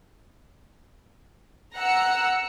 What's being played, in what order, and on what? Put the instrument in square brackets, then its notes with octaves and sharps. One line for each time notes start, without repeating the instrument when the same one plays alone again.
[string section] F#5 A#5 E6 C#7